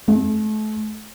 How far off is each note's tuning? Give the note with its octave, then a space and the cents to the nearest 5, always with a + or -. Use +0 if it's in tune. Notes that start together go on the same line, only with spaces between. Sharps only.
A3 -35